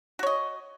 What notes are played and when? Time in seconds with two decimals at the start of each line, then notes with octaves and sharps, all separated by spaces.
0.19 F#4
0.23 C#5
0.27 D#5